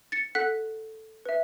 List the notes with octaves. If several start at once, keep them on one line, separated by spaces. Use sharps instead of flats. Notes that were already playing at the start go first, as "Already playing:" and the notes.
A6 C#7
A4 F#5 F#6 B6
B4 E5